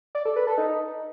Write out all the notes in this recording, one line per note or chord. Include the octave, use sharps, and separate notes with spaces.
D5
A4
B4
A4
D#4